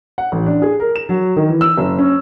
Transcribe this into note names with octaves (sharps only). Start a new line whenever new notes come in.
F#5
A1
D4
G#4
A#4
E7
F#3
D#3
E3
E6
F#1
C#4